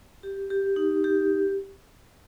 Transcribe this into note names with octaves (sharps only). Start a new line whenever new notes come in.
G4
G4
D#4
G4